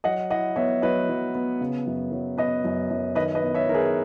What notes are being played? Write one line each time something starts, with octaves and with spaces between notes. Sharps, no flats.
F#3 D#5 F#5
E4 D#5 F#5
B3 C#5 E5
F#3 B4 D#5
F#3
B3
C#3
F#2
F#3
B3 B4 D#5
F#2
F#2
D#3 B4 D#5
B4 D#5
B3
C#5 E5
D#3 A#4
G#4 B4